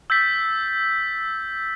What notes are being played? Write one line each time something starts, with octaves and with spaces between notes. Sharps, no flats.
E6 G6 A6 B6